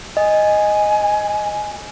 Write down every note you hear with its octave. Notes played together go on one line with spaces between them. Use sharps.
D#5 G#5